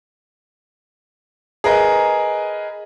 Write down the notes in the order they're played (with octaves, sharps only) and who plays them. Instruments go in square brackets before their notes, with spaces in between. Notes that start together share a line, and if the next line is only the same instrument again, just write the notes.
[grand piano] G#4 A#4 B4 D#5